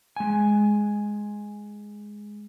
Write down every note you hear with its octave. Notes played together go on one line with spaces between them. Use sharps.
G#3 G#5